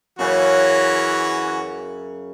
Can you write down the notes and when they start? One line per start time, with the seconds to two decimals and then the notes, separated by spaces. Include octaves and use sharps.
0.19 F#2 C#3 E3 C#4 F#4